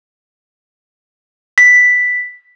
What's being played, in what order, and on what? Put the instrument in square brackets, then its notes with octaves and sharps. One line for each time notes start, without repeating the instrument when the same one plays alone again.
[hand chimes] B6